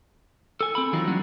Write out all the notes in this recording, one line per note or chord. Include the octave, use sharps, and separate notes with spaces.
A4 G#5
C4 A4 B5
D#3 E3 F#3 C4 D#4 F4
F#3 G3 A#3 C#4 D4